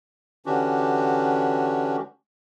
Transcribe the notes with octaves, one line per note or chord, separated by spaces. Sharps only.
D3 E3 C#4 D4 F#4 G4